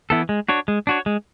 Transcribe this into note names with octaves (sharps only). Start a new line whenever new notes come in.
E3 B3 E4 A4
G#3
D4 F#4 C#5
G#3
D4 F#4 C#5
G#3